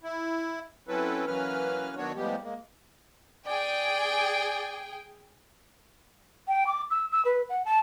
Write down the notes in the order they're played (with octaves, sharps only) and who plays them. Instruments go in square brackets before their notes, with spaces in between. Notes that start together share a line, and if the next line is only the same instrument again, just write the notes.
[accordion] E4
F#3 C4 C#4 E4 A4 B4
E3 F#3 A#3 C#4 B4 F6
D#3 F#3 B3 D4 F#4 C#5
A2 F3 G3 G#3 B3 G4
G#3 A#3
[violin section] G#4 G5 G#5 [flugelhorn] D5
[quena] G5
D6
E6
E6
B4
F#5
A5